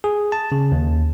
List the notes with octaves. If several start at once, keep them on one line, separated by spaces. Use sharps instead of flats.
G#4
A5
C#3
D#2